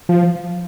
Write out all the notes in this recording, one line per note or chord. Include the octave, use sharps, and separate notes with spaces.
F3